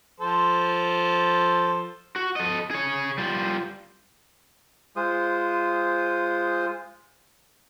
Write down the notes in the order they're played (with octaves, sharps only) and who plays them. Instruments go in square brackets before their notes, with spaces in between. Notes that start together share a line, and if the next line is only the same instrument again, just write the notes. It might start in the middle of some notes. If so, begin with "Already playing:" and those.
[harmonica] F3 A4 C5
[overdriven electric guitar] F#4
A4 D#5
G#4 C#5
G3 F4
[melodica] G#3 F4 C5 D#6